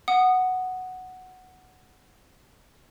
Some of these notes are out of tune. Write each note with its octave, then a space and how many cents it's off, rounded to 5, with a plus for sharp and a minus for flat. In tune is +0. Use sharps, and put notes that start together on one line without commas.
F#5 +0 D#6 -15